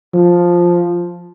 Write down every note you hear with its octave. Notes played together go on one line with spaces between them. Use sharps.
F3